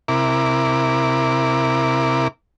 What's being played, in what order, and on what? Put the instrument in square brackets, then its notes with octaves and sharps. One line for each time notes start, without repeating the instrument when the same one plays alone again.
[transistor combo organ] C3 E4 A#4 D6